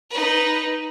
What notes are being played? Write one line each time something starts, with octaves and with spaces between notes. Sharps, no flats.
D#4 B4